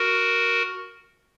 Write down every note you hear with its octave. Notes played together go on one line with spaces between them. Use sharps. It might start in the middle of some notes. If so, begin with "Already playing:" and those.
Already playing: F#4 A#4